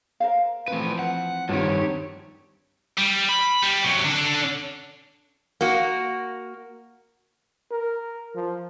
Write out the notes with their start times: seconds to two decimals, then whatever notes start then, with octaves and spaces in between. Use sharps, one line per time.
0.20 A#4 C5 F5
0.68 E3 F3 A3 C4 B4
0.99 F#5
1.49 G2 D#3 C4 F4 G4 B4 C#5 D5
2.97 G3
3.29 B5
3.63 G3
3.84 C3 F#3
4.04 D3 D4
5.61 A#3 F#4
7.72 A#4
8.35 F3